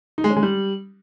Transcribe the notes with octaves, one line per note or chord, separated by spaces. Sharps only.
D#4
G#3
C#4
G#3
G3